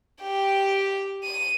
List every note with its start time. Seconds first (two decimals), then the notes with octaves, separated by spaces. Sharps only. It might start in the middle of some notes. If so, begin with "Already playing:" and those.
0.22 G4 G5
1.24 D#7